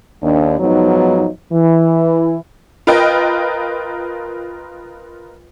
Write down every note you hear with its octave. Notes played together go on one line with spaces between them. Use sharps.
D#2 D4
G#2 F3 F#3 B3 D#4
E3
F4 A#4 B4 D#5 G5 F6